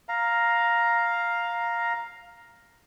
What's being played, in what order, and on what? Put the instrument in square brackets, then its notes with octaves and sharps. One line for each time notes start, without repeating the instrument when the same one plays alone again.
[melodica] F5 A#5